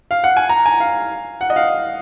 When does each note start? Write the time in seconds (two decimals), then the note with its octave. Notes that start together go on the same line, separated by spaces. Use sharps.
0.11 F5
0.24 F#5
0.37 G#5
0.49 A#5
0.66 G#5
0.80 F5
1.41 F#5
1.50 D#5
1.56 F5